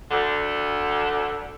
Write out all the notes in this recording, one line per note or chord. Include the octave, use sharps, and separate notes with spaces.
D2 D3